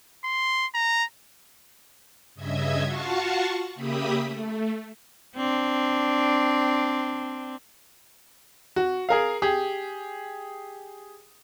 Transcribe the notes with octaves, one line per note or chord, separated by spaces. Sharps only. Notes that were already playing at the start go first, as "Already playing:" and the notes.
C6
A#5
G2 C#3 D#5 E5 G#6
F4 F#4 F5 F#5 A5 C#6
C#3 A#3 G4 E5 B5 D#6
A3
C4 D4
F#4
G#4 A#4 F5
G4 G#4